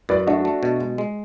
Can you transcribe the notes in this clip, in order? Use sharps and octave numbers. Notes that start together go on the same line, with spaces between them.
F#2 B4 D5
A3 D4 F#4
A3
B2
G#3
G#3